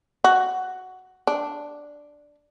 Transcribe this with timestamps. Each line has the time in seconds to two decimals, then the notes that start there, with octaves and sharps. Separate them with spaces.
0.24 F#4
1.27 D4